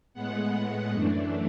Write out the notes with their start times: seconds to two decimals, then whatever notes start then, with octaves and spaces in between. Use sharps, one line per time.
0.14 A2 G#3 B3 F#5
0.91 F#2 E3 A3 D4